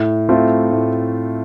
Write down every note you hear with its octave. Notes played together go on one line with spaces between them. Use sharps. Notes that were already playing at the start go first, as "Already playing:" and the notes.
Already playing: A2
A3 C4 F4
A2